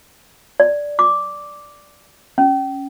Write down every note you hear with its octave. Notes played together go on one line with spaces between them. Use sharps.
D5
D6
C#4